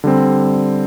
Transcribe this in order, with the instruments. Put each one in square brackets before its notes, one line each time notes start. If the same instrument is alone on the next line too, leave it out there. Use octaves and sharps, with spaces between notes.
[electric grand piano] D3 G3 C4